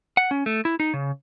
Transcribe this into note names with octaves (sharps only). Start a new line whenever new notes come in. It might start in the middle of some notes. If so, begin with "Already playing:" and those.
F#5
C#4
A3
E4
D#4
C#3